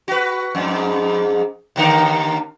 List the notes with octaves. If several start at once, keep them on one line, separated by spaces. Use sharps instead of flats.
F#4 B4
F2 G#2
D#2 D3 A#4